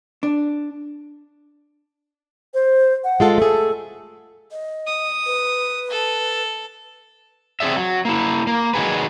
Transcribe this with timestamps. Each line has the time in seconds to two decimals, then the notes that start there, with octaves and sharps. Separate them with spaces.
0.23 D4
2.54 C5
3.04 F#5
3.20 G#3 F4 A4
3.38 A3 G#4 A4
4.52 D#5
4.87 D#6
5.26 B4
5.91 A4
7.60 C4 C#4 G#4 D5 E5
7.76 F#3
8.05 A#3 E4
8.47 A#3
8.74 D#3 F#3 G#4 B4